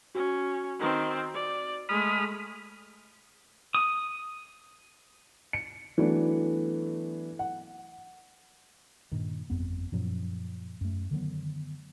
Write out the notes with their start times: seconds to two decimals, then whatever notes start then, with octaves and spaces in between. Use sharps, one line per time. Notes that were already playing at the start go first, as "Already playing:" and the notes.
0.15 C#4 F#4
0.80 D#3 C4
1.34 D5
1.89 G#3 A3 B5 D#6 F6
3.75 D#6
5.53 C#7
5.98 E3 F#3 A3 B3 D4
7.39 F#5
9.12 G2 A#2 D#3
9.50 G1 F2 B3
9.92 F#2 A#2 F3 F#3
10.81 F#2 A3
11.11 D3 D#3 F#3 B3